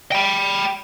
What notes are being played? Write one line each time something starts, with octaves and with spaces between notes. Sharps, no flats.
G5 B5